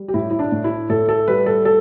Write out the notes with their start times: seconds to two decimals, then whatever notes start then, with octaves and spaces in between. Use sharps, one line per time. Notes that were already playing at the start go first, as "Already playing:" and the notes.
Already playing: G3
0.08 G4
0.14 A2 E4
0.31 E4
0.39 D4
0.52 A2
0.64 E4
0.90 A2 A4
1.09 A4
1.28 G3 B4
1.46 A4
1.65 A4